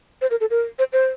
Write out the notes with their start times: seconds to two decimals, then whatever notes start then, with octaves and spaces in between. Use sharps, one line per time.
0.21 C5
0.31 A#4
0.41 A4
0.50 A#4
0.79 C5
0.93 C5